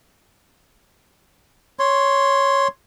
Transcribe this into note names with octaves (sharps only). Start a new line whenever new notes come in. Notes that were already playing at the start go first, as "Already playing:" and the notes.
C#5 C6